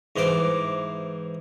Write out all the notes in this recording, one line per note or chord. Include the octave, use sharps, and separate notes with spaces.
G#2 E3 C5 D6